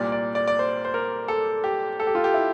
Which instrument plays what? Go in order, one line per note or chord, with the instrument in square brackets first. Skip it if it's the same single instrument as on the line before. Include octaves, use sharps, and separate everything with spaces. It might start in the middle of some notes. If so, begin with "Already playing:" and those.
Already playing: [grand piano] C2 A#2 D5
D5
D5
D5
C5
C5
A#4
A4
G4
A4
G4
F4
G4
E4